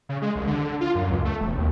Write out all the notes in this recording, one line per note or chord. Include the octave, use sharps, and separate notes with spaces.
C#3
G#3
C2
D3
D3
F4
F#2
C#2
A3
E1
D#2